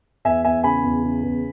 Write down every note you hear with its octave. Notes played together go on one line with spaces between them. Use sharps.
E2 E5 G#5
E2 E5 G#5
C#3 G#5 B5
E2
C#3
E2